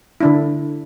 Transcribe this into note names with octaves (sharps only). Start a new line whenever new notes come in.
D3 D4 E4